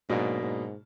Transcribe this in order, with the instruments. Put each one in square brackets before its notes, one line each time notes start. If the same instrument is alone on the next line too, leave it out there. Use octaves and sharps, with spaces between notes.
[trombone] G#2 [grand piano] B2 F#3 A#3 D4
[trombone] G#2